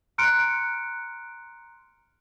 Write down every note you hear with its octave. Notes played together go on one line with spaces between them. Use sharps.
A#5 C6 F6 F#6 C#7 D7